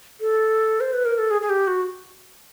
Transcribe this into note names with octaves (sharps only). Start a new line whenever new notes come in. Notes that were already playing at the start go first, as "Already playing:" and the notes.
A4
C5
B4
A#4
A4
G#4
G#4
G4
F#4